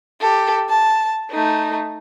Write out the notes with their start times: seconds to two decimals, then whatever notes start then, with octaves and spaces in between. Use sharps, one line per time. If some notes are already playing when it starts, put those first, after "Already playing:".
0.21 G4 A4
0.69 A5
1.31 A3 D#4